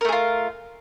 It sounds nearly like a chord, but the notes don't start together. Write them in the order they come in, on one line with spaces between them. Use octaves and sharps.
A#4 A3 G#4 F4